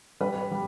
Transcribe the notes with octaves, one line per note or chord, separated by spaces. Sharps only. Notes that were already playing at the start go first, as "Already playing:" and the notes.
G3 B4
G3